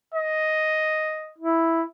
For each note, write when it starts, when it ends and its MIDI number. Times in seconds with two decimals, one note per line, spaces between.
0.14 1.34 75
1.39 1.83 64